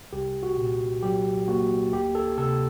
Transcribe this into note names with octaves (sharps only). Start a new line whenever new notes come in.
C2 G4
F#4
A#2
F#3 G4
A#3 F#4
D2 G4
A4
C3 A4